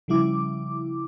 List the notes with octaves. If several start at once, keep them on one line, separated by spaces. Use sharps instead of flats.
C#3 F3 G3 E4 D6